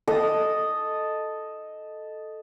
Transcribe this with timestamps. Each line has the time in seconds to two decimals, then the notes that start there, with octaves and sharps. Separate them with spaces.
0.07 A4 D#5 D#6